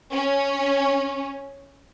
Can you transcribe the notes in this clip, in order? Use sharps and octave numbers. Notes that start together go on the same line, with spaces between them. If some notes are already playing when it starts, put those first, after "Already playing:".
C#4